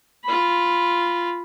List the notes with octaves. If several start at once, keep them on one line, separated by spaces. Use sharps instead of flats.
F4 B5